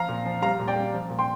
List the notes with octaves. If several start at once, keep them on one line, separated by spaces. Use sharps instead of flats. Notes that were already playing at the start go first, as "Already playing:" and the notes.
Already playing: F3 F5 A#5
A#2
F3
G3 F5 A#5
A#2
D5 G5
G3
F3
A#2
G5 C6